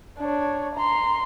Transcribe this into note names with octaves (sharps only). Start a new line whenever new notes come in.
D4 C#5
A#5 C6